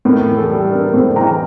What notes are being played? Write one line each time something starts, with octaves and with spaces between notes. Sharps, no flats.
A2 A#4
E3
A4
G3
D4 A#4
A2 A4 C5
E3 G5 A#5